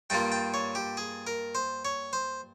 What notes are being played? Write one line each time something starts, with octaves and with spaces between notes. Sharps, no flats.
G2 G3 A#3 F4 G5
G5
C#5
G4
G#4
A#4
C5
C#5
C5